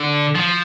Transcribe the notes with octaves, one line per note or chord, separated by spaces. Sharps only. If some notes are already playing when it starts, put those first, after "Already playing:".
Already playing: D3
F3